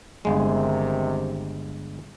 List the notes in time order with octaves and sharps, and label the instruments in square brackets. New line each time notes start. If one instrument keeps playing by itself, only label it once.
[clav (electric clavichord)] G1 G#3 [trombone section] C3 D#3